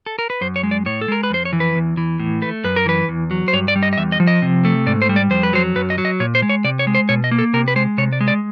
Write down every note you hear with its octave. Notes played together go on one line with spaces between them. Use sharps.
A4
A#4
B4
F#2 C5
C#5
G#3
D5
A2 C#5
A4
G#3 A#4
B4
F2 C5
C#5
E3
B4
E2
E3
A2
A3 B4
F#2 B4
A#4
E3 B4
E2
F#3
C5
G2 C#5
D5
G3
D#5
D#5
E2 E5
D#5
F3
D#5
C3
A3
G#2 D5
C5
G3
D5
F2 C5
B4
F#3 C5
F#2 B4
D#5
F#3
D#5
A#2 C#5
C5
G#3
C#5
C3 D5
C#5
G#3
C5
B2 C#5
D#5
A#3
A4
C3 A#4
B4
G#3 C5
C3 C#5
D5
G#3
D5